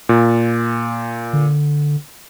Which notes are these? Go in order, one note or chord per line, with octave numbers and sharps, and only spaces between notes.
A#2
D3